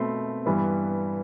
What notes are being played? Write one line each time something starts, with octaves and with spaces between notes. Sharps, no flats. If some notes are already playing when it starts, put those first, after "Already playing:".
Already playing: B2 A3 C4 B5 C6
G2 E3 G3 B3